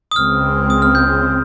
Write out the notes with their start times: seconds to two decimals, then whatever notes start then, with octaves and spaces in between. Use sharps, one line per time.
0.11 D#6
0.15 C#2 C#3 G#3 C4 F6
0.70 D#6
0.82 F6
0.95 G6